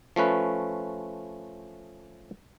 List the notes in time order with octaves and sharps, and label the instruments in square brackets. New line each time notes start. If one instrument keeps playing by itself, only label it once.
[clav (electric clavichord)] F3 A3 C#4 B4